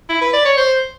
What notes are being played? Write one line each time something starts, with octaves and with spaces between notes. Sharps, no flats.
E4
B4
D5
C#5
C5